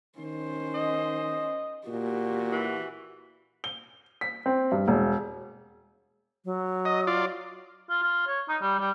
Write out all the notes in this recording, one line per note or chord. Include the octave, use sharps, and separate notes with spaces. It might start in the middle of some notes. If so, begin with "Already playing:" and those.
D#3 C#4 C5
D#5
A#2 F#4 G4
E3
G7
B6
C4
G2
E1
F#3
D#5
F4 D5
F4
F4
C#5
D#4
G3
G3